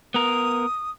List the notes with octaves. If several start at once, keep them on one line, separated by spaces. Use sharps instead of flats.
B3 A#4 D#6